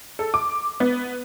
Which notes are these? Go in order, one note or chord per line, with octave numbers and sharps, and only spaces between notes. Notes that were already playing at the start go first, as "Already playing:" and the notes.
A4
D6
B3